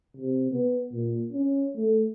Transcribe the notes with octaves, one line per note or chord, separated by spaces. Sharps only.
C3
B3
A#2
C#4
A3